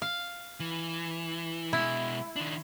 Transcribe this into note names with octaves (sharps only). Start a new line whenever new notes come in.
F5
E3
B2 G#3 E4
D#3 D4